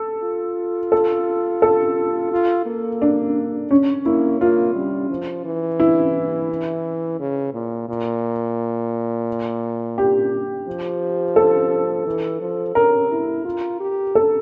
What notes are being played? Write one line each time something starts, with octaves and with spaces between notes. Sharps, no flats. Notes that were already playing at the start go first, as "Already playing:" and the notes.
Already playing: A4
F4
A4
A4
F4
A#3
D4
C#4
A#3 E4
A#3 F4
G3
F3
E3
E4
C#3
A#2
A#2
G4
F3
A4
E3
F3
C#4 A#4
E4
F4
G4
A4